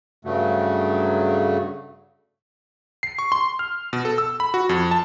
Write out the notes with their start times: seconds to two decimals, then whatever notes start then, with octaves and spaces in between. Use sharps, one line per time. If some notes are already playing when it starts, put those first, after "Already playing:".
0.25 G2 C#3 F#3 A3
3.03 C7
3.19 C#6
3.32 C6
3.59 F6
3.93 B2
4.05 A4
4.18 E6
4.40 B5
4.54 F#4
4.69 F2
4.91 A5